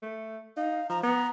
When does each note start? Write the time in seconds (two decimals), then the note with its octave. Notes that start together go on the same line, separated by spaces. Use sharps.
0.02 A3
0.57 D#4 F5
0.90 F3 A#5
1.03 B3 A#5